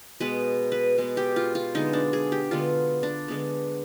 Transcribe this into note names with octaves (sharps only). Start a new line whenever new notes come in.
B2 G#3 B3 B4
B4
B2 G#3 B3
G4
F4
F4
D3 G#3 B3 D#4
D4
G#4
G4
D3 G#3 B3 F4
D4
D3 G#3 B3